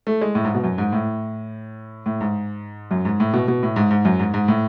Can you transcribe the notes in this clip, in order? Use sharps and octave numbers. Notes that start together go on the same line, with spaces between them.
A3
G#3
A2
G#2
B2
F#2
G#2
A2
A2
G#2
F#2
G#2
A2
B2
B2
A2
G#2
G#2
F#2
G#2
G#2
A2